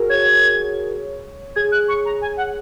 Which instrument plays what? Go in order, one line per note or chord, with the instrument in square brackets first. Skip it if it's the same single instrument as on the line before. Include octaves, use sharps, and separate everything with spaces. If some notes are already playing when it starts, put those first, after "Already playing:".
Already playing: [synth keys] F#4 G#4 A#4
[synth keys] C#5 [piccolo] G#6
[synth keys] G#4 [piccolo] G#6
[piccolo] F#6
C#6
A#5
G#5
F#5